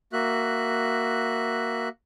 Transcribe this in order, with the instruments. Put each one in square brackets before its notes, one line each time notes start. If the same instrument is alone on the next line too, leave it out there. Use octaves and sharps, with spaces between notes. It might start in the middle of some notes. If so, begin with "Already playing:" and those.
[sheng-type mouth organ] A#3 F#4 E5 F#6